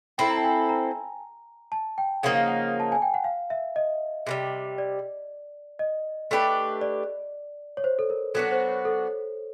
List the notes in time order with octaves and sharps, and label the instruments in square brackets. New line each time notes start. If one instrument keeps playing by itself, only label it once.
[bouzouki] C4 E4 A4 [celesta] G5
[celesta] A#5
A5
G#5
A#5
A5
G5
[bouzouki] C#3 F3 A#3 D#4 [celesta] F#5
[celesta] F5
F#5
A5
G#5
G5
F#5
F5
E5
D#5
[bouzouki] C3 D#3 G3
[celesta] D5
D#5
[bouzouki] A3 D4 G4 B4
[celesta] D5
C#5
C5
A4
A#4
[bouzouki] F#3 B3 D4 F#4 [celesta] A4
[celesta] C5
C#5
A4